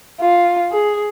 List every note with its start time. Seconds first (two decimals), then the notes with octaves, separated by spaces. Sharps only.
0.21 F4
0.72 G#4